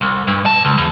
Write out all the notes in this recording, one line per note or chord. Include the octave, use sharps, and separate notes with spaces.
C2
G2
B1 A5
C#2
E2